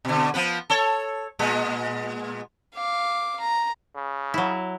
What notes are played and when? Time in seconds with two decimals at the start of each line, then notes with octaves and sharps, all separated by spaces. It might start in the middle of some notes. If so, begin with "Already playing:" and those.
0.05 B2 D3
0.34 F3 B3 B4
0.70 A4 C#5
1.39 A#2 G#3 B3
2.74 F5 D6
3.40 A#5
3.96 C#3
4.34 F#3 E4